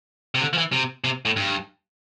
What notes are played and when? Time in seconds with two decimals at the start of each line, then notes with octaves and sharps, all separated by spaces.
0.35 C3
0.41 D3
0.53 F3
0.58 E3
0.72 C3
1.04 C3
1.25 A2
1.36 G2